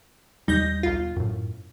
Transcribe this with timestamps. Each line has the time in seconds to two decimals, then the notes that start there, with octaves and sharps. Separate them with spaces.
0.48 D#2 G3 D#4 G6 A#6
0.83 B1 F4
1.16 F#2 A2